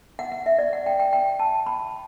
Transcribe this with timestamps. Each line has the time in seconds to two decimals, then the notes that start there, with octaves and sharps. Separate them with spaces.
0.19 F#5
0.32 F#5
0.46 E5
0.59 D5
0.73 F#5
0.86 G5
1.00 G5
1.13 G5
1.39 A5
1.66 B5